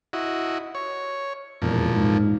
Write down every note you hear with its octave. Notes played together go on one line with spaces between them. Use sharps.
E4 F#4 D#5
C#5
E1 F2 A#2
G#2